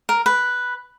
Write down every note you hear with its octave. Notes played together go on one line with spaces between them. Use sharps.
A#4
B4